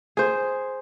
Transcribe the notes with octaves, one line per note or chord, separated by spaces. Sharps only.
G#4 C5